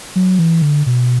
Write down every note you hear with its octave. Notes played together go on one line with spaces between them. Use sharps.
F#3
E3
D3
B2